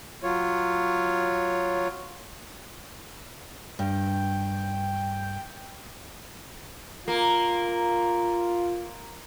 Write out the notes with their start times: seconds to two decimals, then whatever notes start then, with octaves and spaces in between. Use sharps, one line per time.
0.23 F#3 F4 C#5
3.79 G2 G5
7.08 A#3 F4